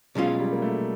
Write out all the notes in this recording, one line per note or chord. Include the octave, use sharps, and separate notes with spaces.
B2 F#3 G#3 C#4 F4
G3
A#3
A3